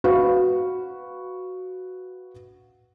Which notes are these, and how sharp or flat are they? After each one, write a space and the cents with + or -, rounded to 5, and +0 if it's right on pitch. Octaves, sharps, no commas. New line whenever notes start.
F#4 +0 B4 +0 F5 +0